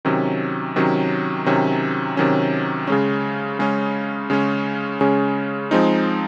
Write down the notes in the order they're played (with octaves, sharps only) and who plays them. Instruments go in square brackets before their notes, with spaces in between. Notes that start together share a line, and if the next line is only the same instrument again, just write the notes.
[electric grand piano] C3 D#3 F#3 C#4
C3 D#3 F#3 C#4
C3 D#3 F#3 C#4
C3 D#3 F#3 C#4
C#3 G#3 C#4
C#3 G#3 C#4
C#3 G#3 C#4
C#3 G#3 C#4
F3 G#3 C4 D#4